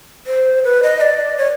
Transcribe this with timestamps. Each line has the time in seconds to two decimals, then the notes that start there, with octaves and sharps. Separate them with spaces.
0.27 C5
0.64 B4
0.83 D#5
1.01 D5
1.38 C#5